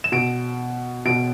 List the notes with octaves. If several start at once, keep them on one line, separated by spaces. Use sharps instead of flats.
E7
B2 D7
B2 D7